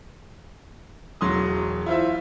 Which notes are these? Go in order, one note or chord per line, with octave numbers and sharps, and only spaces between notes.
E1 F#3 C6 D#6
E4 F4 C5 E5